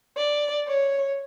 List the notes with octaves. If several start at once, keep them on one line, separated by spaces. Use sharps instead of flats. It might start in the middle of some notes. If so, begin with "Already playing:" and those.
D5
C#5